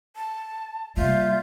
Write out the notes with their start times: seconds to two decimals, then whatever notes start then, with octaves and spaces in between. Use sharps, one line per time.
0.16 A5
0.97 C3 G3 A#3 F4 E5 G6